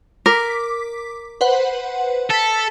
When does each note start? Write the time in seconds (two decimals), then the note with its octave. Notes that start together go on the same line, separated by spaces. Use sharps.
0.26 A#4 D6 B6
1.41 B4 C5 F#5
2.30 A4 A6 B6